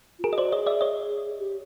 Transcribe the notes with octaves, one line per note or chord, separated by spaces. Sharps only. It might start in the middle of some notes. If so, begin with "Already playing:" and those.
F4
F#4 G#4 A#4
D#5
C5 D5
G#4 C#5 D#5
D5 E5
C#5 D#5
G4